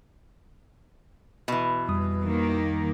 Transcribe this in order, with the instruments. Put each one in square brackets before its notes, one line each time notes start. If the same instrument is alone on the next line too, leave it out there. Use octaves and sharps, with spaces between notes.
[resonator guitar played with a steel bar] B2 E3
[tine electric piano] F2 G3 D#6
[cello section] D#3 A#3